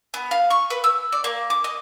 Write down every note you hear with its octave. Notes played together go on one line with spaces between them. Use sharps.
B3
F5
C#6
B4
E6
D5
A#3
D6
D#5